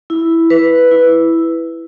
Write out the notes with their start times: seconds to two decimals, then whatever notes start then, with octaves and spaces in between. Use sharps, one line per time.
0.10 E4
0.50 B4
0.91 E4